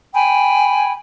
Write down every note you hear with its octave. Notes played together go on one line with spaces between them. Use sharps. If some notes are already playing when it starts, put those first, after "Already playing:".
G5 G#5 B5